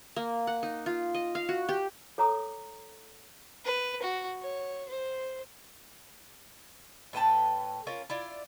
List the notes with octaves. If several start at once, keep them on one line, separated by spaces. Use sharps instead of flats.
A#3
F#5
D#4
F4
D#5
F5
F#4
G4
A4 C#5 A#5 D6 D#6
B4
F#4
C#5
C5
A2 B4 G5 A5
C#4 F4 A#4
E4 F4 D5